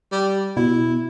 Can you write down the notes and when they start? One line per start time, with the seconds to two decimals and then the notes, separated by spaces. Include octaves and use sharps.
0.12 G3
0.57 B2 E4